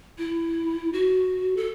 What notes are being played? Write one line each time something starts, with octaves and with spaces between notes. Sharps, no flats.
E4
F#4
A4